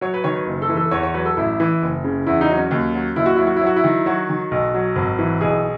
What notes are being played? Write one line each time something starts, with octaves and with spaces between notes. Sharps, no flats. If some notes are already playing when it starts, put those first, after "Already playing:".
F#3 C#5
B4
D#3 C#5
B4
F#1
A4
E3
A4
E2 C#5
C#5
F#3 B4
A4
A1 E4
E3
F#1
C#3
E2 E4
D#4
F#3
C#4
D#2
F#3
D#2 E4
F#4
F#3 E4
F#4
E4
F#3
F#4
E4
D#3
F#3 F#4
D#3
B1
F#3
G#1
E3
B1 G#4